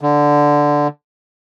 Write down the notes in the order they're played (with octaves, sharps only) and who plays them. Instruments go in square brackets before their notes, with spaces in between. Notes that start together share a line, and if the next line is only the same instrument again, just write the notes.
[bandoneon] D3